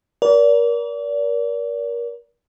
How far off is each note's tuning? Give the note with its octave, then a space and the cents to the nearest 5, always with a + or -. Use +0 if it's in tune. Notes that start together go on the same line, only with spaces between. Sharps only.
A#4 +30 D5 -35